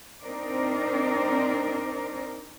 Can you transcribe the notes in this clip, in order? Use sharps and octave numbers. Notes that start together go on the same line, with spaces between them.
C4 D4 D#4 A#4 C5 D5